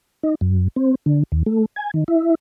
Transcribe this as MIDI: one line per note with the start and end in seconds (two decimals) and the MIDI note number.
0.23 0.35 63
0.41 0.68 42
0.76 0.95 60
1.06 1.23 50
1.32 1.43 39
1.46 1.65 57
1.76 1.91 80
1.94 2.04 51
2.08 2.35 64